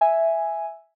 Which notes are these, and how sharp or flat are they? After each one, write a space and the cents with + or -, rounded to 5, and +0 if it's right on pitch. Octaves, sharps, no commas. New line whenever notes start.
E5 +0 G#5 +0